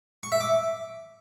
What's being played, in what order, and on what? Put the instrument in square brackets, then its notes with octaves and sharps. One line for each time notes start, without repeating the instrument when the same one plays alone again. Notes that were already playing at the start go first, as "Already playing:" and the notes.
[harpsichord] C#6
E5
D6